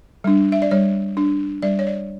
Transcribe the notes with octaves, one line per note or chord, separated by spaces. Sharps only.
G3 D4
E5
D5
G3 C#5
D4
G3 D5
C#5
D5